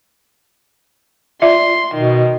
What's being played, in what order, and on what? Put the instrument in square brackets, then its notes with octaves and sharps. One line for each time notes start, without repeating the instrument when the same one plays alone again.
[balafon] F4 D5 E5 [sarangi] C6
[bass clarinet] B2 [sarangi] D#3